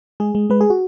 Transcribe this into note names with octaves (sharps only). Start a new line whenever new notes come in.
G#3 G#4
G#3
G#3 B4
G#4
F#4